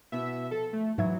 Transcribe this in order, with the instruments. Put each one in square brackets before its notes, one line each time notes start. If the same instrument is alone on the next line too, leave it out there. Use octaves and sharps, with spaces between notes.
[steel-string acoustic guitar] B2 B3 E4 [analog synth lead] E5
[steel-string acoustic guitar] F3 [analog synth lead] A4
[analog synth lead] A3
[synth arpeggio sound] G#2 E5 G#6 [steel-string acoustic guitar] E3 [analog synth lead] F#3